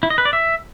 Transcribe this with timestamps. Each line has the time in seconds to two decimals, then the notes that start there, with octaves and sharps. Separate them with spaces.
0.03 E4
0.10 D#5
0.18 B4
0.25 D5
0.33 E5